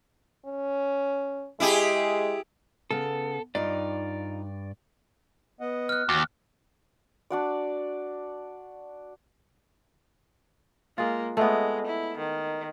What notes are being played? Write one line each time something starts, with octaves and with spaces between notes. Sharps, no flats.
C#4
G#3 E4 G4 G#4
C#3 B3 A4
G2 D#4 F4 D5
B3 D#5 F#5
F6 F#6
D#2 F#4
D4 F#4 D5
G#3 A#3 F4
G#3 A3 B3
E4
D#3